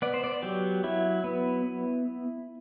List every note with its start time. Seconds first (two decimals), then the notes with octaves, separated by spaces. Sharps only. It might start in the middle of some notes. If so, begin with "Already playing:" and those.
0.02 B3 D5
0.14 C5
0.24 D5
0.43 F#3 G4
0.84 F#3 E4
1.24 B3